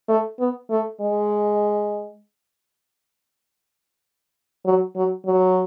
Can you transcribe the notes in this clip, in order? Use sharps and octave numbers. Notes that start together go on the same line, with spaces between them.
A3
B3
A3
G#3
F#3
F#3
F#3